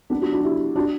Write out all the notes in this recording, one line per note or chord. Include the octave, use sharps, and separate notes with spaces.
B3 D4
D4 F#4
D4 F#4
E4 G4
D4 F#4